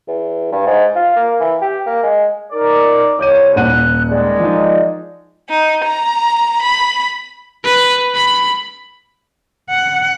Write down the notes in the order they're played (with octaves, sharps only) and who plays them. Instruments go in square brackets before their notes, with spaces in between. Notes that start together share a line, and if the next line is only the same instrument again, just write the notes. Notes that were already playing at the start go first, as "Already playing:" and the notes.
[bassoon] E2
G2
G#2
F4
A#3
E3
G4
A#3
G#3
[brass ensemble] D#4 D5 [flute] A#4
[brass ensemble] C2 [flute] C#5 [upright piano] D6 G6 D#7
[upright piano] D#1 F#5 D#7 [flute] F#6
[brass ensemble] D#3 G#3 [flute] D5
[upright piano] F3 D#4
[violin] D#4
A#5
B5
[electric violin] B4
B5
[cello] F#5